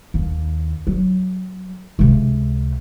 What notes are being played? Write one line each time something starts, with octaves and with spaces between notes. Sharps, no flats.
D#2
F#3
C#2 C3